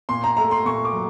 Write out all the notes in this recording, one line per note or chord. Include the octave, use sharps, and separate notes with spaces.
A#2 C6
A#5
A3 A#5
C6
A#2 C#6
D6
F#3